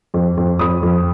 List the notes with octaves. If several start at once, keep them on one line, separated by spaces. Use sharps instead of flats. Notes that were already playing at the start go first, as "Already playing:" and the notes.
F2
F2
F2 B5 D#6
F2